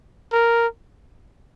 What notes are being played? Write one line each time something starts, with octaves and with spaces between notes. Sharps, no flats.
A#4